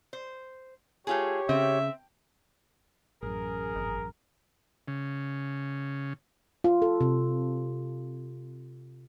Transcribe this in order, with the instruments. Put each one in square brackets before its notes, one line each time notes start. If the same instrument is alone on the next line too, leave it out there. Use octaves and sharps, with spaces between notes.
[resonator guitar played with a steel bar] C5
[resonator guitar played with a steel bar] A3 F4 G#4 [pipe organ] G4 C#5
[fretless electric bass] C#3 [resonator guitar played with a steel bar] C4 [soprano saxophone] E5
[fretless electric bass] A1 F#2 [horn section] G#4 A#4
[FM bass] G#1
[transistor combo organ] C#3
[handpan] F4
A4
C3